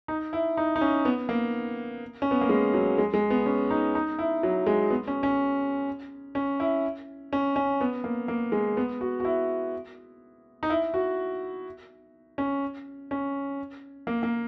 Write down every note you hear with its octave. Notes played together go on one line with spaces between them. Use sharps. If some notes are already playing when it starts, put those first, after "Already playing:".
D#4
E4
D#4
D#4
C#4
B3
A#3
C#4
B3
A#3
G#3
F#3
G#3
G#3
B3
C#4
D#4
D#4
E4
F#3
G#3
B3
C#4
C#4
C#4
E4
C#4
C#4
B3
A#3
A#3
G#3
B3
F#4
F#4
E4
D#4
E4
F#4
C#4
C#4
A#3
A#3